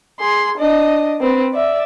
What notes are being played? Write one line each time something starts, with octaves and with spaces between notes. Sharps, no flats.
G#4 C6
D4 D#5
C4 B4
D5 E5